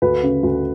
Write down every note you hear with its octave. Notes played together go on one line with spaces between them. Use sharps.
D2 B4
C#3
D2